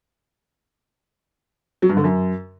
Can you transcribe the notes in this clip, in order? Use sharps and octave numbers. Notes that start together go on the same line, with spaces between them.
F#3
G2
D3
F#2